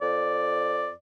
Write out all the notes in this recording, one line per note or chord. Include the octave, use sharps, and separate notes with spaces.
F2 D5